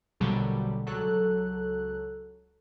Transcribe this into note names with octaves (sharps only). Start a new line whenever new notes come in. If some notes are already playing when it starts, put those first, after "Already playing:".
A#1 B2 D3 F#3 G3
C#2 F#3 A4 F#6